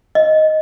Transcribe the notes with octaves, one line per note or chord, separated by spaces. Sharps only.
D#5